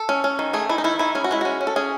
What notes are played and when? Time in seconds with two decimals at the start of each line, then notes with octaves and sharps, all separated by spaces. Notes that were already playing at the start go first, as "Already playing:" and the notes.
Already playing: A4
0.09 C#4
0.24 C#4
0.39 D#3
0.53 A3 G#4
0.69 D#3 E4
0.78 D#4
0.84 D#3 E4
0.99 D#3 E4
1.15 C#4 G#4
1.24 F#4
1.31 G#3 E4
1.41 C#4 F#4
1.61 C#4
1.67 A4
1.76 C#4 G#4